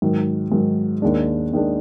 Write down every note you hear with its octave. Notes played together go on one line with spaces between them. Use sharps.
G#2 D#3 F#3
G#2 D#3 F#3
D#2 D#3 G#3 D4
D#2 D#3 G#3 D4